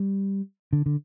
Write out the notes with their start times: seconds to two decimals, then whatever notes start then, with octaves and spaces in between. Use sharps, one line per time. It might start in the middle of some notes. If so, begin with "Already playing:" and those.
Already playing: G3
0.73 D3
0.86 D3